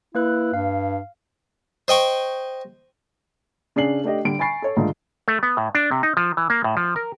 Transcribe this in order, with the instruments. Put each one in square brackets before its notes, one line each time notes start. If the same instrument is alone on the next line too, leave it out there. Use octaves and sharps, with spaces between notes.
[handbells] A#3 B4 F#6 [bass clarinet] E4
[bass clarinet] G2 [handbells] F5
[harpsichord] C5 D#5 G5 C#6
[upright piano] C#3 D4 G#4 C7 F#7
A3 D4 G4 D#5
D3 G3 A4 D7
G#5 B5 C#6 A6 C7
A4 C#5
C#2 G#2 D3 D#3 A3
[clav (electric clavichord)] A3
B3
A2
D4
C3
D#4
F3
E3
A#3
A2
F3
A#4